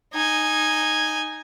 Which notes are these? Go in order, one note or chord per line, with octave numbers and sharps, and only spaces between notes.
D#4 G#5